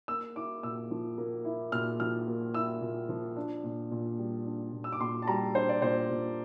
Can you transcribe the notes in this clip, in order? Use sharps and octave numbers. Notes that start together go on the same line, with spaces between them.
A#3 E6
E4 D6
A#2 E6
F3
A#3
E4
A#2 F6
F3 F6
A#3
E4 E6
A#2
F3
D4
A#2
A#2
G3
D4
A#2
E6
D6
A#2 C6
A5
G3 A#5
D4 C5
D5
A#2 C5
A#2